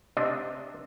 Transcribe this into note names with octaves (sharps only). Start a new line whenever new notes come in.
C3 D4 D#5 E5